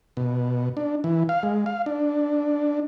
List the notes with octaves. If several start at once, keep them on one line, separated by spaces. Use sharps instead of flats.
B2
D4
E3
F5
G#3
F5
D4